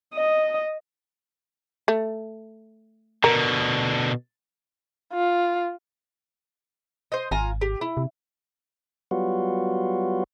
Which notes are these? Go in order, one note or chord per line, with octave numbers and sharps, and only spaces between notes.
D#5
A3
B2 D3 A#4
F4
C5 D#5
G#1 F4 G#5 A#5
G4
E4
C3
F#3 G3 B3 F4 F#4